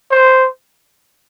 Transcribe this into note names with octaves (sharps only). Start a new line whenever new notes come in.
C5